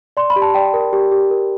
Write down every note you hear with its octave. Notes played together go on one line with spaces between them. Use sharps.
D5 C6
B5
G4
A5
D5 G5
A#4
G4
G4
A#4